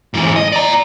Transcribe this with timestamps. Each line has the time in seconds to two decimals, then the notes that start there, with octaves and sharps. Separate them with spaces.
0.14 G#2 E3
0.36 D#5
0.52 D5 A#5